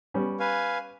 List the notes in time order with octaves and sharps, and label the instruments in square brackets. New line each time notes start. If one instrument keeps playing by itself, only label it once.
[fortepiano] G3 B3 C#4
[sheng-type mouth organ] B4 F5 G#5